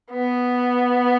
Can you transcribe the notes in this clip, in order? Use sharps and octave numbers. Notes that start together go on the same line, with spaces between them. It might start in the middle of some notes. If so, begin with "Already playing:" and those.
B3